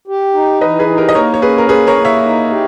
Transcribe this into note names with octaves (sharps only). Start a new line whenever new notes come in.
G4
D#4
E3 B4 D#5
G#4 B4
D#4
G4 A#4
D#5
A#3 A#4 C#5
C#5
C#4 G#4 B4
A#4
A#3 G#4 B4
A#4 C#5
A#3
C#5 E5
D#4
G4